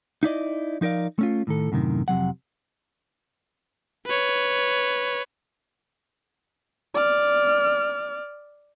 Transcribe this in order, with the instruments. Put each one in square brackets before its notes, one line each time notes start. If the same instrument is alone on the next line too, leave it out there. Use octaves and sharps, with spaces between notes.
[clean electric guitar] D#4 E4 D5 D#5
F3 D#4 A#4 D5 F5
A3 C#4 F4
A2 D#3 A4
F#2 A2 C3 D#3
F2 C3 F#3 F#5
[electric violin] B4 C#5
D5 F6